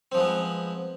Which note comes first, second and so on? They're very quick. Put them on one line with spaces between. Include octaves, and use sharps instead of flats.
C4 F3 G#3 B3